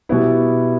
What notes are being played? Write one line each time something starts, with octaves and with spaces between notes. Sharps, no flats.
B2 G3 B3 E4